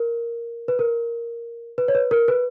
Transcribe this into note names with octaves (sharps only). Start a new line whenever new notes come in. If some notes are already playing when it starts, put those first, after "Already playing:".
Already playing: A#4
B4
A#4
B4
C#5
B4
A#4
B4